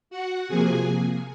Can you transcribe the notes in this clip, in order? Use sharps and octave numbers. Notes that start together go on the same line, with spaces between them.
F#4 F#5
C3 F3 A#3 G#4 G#5